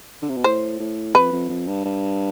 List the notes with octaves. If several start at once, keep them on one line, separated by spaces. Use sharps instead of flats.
D3
C3
B2
A2 C5
A2
F2 B4
F2
F2
G2
G2